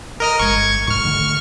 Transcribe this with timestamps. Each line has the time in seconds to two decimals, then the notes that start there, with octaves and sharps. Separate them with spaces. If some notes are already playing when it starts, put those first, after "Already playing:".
0.20 A#4 D#5 F6
0.39 G1 G#3 C#6 G#6
0.88 G#2 C#6 F6
1.05 D3 D#3 A3